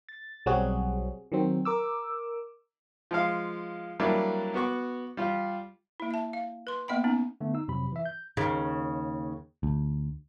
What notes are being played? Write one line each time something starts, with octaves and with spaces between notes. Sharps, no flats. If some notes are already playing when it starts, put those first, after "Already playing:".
A6
B1 F#3 G3 C4 F#4 G#4
D#3 F#3 C4
A#4 D6 E6
F3 G#3 F5
F#3 G3 A#3 D4 E4
B3 F#4 C#6 D6
G3 F4 G4
A#3 E4
E5 A5
F5
B4 C6
A#3 B3 D#5 G5 B5
B3 C#4 D#4
D3 A3 B3
D#4 E6
F2 C3 F#3 B5
E3 E5
G6
D#2 C#3
D2